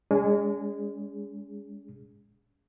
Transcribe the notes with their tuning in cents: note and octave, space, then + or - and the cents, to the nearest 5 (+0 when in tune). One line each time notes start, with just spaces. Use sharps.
G#3 -20 C#4 +40 G#4 -10